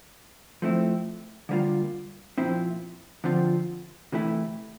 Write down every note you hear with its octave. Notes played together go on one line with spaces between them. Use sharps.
F3 A3 C4 E4
D3 G3 A#3 F4
A#2 F3 C4 E4
D3 F3 C4 F4
C3 E3 A3 E4